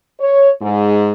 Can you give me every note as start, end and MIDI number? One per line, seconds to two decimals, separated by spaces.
0.19 0.50 73
0.61 1.12 44